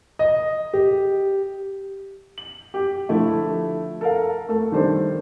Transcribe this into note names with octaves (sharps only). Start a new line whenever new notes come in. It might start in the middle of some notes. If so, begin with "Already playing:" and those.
D#5
G4
F#7
G4
D3 F3 A3 E4
A4 A#4 F5
A3 A4
D#3 G3 D4 A4 C5